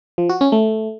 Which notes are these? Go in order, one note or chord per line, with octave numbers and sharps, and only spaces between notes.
F3
F#4
C#4
A3